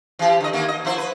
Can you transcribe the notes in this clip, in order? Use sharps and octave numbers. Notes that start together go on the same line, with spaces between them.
E3 G4
D3 D#5
D#2 D#3 A#3
D#5
F3 E4 C5
B4